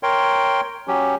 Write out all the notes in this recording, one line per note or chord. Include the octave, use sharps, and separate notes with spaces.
A#4 C#5 G5 C6
F#3 C#4 G4